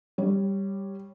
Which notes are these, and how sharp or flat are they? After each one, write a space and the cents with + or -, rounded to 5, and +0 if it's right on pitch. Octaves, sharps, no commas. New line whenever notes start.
G3 +0 C#5 +0